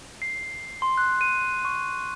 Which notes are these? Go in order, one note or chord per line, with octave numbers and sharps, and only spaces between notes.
C7
C6
F#6
D#7
C#6